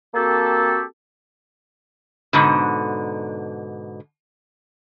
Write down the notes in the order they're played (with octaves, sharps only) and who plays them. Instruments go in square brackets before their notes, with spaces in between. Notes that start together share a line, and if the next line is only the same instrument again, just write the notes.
[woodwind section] A#3 C4 F#4 G4 A4
[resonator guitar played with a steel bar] G#2 B2 D3